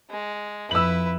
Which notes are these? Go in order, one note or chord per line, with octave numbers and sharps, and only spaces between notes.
G#3
F2 E4 B4 E6 F#7